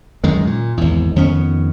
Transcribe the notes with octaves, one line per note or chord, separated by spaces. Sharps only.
F#2 D#3 G#3
A#2
G#1 E2
F2 D#3 B3 C#4